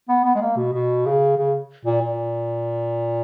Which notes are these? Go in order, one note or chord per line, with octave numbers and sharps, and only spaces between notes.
B3
B3
G#3
A#3
B2
B2
C#3
C#3
A#2
A#2